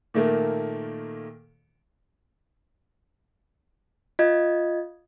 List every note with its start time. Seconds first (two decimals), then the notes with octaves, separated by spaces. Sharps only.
0.14 A#2 D#3 A3 A#3
4.19 F4 D#5 G#6